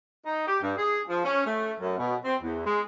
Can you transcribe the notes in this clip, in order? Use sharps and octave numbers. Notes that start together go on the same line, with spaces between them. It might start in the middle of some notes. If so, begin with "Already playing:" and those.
D#4
G4
G2
G#4
F3
C#4
A3
F#2
B2
C4
E2
G#3